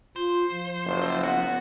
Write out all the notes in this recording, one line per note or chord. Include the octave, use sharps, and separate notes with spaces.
F4 C5
F3
F#1
B3 F#4